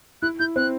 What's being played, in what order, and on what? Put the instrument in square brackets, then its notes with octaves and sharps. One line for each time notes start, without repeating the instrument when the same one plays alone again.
[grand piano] E4 [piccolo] F#6
[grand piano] E4 [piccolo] G6
[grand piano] C4 [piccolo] F#6